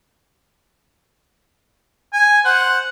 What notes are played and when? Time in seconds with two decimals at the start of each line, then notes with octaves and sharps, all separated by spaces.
2.13 G#5
2.45 C5 F#5